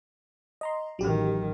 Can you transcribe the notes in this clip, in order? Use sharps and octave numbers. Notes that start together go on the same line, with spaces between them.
D#5 A#5 C6
A1 D#3 F#3 G4